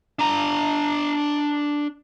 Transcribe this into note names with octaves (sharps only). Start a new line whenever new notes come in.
D4 A#5